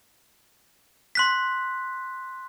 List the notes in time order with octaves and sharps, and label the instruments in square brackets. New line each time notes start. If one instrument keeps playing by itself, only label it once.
[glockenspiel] C6 F#6 B6